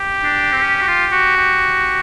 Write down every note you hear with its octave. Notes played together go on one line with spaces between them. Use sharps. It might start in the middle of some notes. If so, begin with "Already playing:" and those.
Already playing: G4
D4
C4
C#4
F#4
F4
F#4
G4